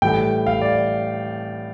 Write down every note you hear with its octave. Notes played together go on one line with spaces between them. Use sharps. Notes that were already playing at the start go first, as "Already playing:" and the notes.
A2 E3 G3 G5
F5
D5